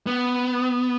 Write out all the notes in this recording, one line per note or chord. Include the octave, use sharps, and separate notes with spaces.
B3